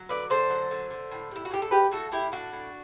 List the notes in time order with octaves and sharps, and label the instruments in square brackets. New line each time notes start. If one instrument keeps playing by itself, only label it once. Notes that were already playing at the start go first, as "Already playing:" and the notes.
Already playing: [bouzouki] F#3
D3 B4 D5
D3 A4 C5
F#3
D3
D3
A2
G3 E4
F#4
A2 G4
A4
G3 G4 B4
A2 F#4 A4
A2 E4 G4
A2 D4 F#4
A2